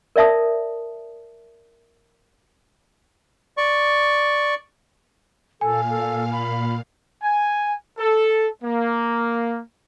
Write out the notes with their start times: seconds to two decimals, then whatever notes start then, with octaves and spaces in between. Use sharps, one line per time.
0.16 A#4 D5 E5 A5 D#6
3.57 D5 C#6
5.61 A#2 A4 F5 G#5
5.90 A4
6.32 B5
7.22 G#5
7.98 A4
8.64 A#3